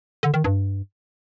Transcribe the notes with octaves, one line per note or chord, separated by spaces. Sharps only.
D3
D#3
G2